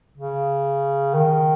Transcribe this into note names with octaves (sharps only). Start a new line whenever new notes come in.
C#3
D#3